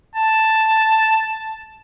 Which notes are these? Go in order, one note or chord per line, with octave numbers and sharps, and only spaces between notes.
A5